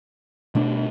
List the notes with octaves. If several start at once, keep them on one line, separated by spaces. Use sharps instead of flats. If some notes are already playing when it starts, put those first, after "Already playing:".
B2 A3 D4